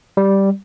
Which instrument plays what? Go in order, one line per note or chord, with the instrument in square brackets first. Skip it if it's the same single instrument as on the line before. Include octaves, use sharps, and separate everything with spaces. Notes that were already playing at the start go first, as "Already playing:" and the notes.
[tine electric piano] G3